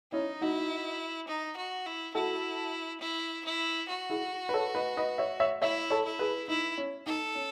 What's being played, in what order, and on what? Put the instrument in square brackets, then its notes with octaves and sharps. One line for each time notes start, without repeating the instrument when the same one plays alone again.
[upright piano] C#4 E4 [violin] D#4
[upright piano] D#4 F#4 [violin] E4
[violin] D#4
F#4
E4
[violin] E4 [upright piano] F#4 A4
[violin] E4
E4
F#4
[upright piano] E4 G#4
B4
A4 C#5
B4 D#5
B4 D#5
C#5 E5
C#5 E5
[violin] E4 [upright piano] C#5 E5
[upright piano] A4 C#5
[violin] E4
[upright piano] G#4 B4
[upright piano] D#4 [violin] E4
[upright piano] C#4
[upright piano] D#4 [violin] A4
[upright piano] C#4